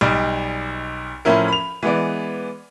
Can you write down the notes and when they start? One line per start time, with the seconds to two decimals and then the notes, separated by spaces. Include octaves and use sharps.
0.01 B1 G3 D5 D#5
1.25 A2 F3 C#4 E4 A#4
1.48 B5 F7
1.83 E3 G#3 B3 D5